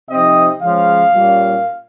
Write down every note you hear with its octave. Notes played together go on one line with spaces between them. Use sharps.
C3 F3 C4 D#4 D#5
C#3 F3 G#3 C#4 F5
A#2 G3 C#4